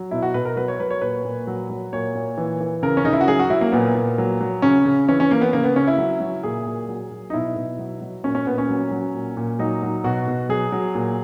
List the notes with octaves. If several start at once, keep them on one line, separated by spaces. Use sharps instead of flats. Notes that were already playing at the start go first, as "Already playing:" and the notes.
Already playing: F#3
B2 E4
F#4
B2 B4
A#4
F#3 B4
C#5
F#3 B4
C#5
A#2 B4
A#2
F#3
F#3
A#2 C#5
A#2
E3
E3
C#3 A#4
C#4
C#3 D#4
E4
F#4
F#3 G#4
F#4
F#3 E4
A#3
A#2 B3
A#2
F#3
F#3
C#3 C#4
C#3
E3 C#4
C#4
E3 A#3
B3
C#3 A#3
B3
C#3 C#4
E4
F#3
F#3
A#2 G#4
A#2
F#3
F#3
D#4
B2 E4
B2
F#3
F#3
A#2 C#4
C#4
A#2 B3
C#4
F#3
F#3
A#2
A#2
F#3 D#4
F#3
B2 F#4
B2
F#3 G#4
F#3
A#2